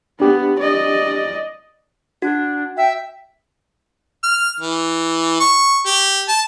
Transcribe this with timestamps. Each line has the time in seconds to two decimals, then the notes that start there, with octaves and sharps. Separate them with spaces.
0.20 B3 D4 G4
0.60 D5 D#5
2.22 D4 F#4
2.77 E5 G5
4.23 F6
4.60 E3
5.40 C#6
5.86 G4
6.28 A5